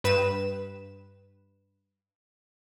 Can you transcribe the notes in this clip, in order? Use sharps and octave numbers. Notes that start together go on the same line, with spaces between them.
G2 B4 E7